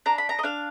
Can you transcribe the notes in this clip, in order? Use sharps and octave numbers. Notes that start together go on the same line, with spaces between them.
D4 A#5
B5
A#5
D#5
D4 F5